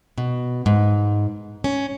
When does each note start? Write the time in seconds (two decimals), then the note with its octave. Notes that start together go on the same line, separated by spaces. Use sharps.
0.18 B2
0.66 G#2
1.64 C#4